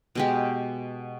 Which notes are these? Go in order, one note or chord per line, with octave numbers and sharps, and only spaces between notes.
B2 G#3 G4